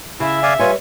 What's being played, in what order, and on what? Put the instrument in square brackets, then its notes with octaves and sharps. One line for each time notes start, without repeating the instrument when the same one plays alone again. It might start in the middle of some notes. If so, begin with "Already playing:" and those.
[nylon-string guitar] C#3 [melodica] E4 [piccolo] E5
[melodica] D5 F5 G#5
[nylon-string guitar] G3 B4 C#5 [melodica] F4 G#5